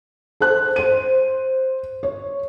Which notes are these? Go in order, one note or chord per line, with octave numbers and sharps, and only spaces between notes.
A4 C5 F#6
C5 D#7
C#5